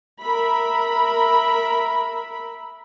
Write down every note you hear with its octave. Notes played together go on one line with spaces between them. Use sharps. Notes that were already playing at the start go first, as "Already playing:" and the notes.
A#4 E5 B5